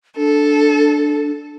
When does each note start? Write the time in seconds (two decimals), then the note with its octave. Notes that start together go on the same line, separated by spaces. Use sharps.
0.17 D4 A4